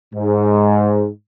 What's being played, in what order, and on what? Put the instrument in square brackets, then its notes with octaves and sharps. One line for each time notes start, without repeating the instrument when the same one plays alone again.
[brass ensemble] G#2